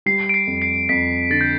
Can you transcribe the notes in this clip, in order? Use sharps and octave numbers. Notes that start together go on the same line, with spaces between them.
G3 C7
D7
C7
F2
C7
F2 B6
D3 A6
G6